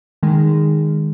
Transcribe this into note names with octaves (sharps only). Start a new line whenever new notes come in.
D#3 G#3